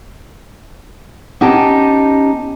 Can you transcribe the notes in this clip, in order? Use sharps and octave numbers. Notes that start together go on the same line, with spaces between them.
B3 C#4 D#4 G4 G5 A5